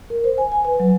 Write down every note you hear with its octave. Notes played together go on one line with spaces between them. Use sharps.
A#4
C5
G#5
G#5
B4
F#3